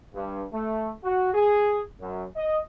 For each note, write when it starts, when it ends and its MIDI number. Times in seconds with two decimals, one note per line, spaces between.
0.14 0.44 43
0.53 0.90 57
1.04 1.33 66
1.34 1.80 68
2.00 2.25 42
2.36 2.59 75